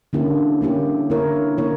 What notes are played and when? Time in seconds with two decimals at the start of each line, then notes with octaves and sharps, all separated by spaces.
0.13 D3 A#3 C#4 E4 G4
0.61 D3 A#3 C#4 E4 G4
1.10 D3 A#3 E4 A#4 C#5
1.58 D3 A#3 E4 A#4 C#5